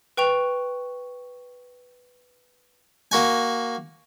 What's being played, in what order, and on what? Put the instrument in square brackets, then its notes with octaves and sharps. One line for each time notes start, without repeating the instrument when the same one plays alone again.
[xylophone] B4 G5 C#6 F7
[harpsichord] A#3 F#4 G#5